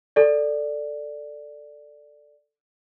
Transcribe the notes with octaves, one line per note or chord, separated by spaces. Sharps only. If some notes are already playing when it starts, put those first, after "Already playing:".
A4 D5